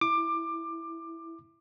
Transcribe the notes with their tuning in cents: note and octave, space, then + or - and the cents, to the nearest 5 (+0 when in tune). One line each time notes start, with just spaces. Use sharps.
E4 +0 D6 +20